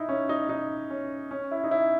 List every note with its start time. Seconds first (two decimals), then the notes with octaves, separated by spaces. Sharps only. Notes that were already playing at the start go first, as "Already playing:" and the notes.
Already playing: D#4 E4
0.09 C#4
0.29 D#4
0.49 D#4
0.90 C#4
1.31 C#4
1.51 E4
1.64 D#4
1.71 E4